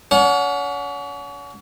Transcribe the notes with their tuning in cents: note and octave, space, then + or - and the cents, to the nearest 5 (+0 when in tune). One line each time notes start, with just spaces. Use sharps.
C#4 +40 F#5 -15